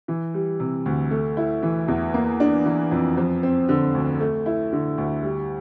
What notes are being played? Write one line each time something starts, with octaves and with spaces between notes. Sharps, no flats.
E3
G3
C3
D2
A3
E4
E3
E2
A#3
D4
E3
F2
F3
C4
D3
D2
A3
E4
D3
D2
G3